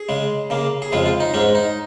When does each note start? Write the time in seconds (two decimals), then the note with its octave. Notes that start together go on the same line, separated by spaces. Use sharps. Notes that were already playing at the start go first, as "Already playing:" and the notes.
Already playing: G#4
0.09 C#3 G#3
0.50 C#3 A#3
0.82 G#4
0.92 F2 C#3 G#3 F4
1.06 F4
1.20 D#4
1.34 G#2 G#3 C#4
1.55 D#4